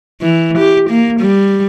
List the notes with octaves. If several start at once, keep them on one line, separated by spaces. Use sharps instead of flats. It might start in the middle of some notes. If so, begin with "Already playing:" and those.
E3
G4
A#3
G3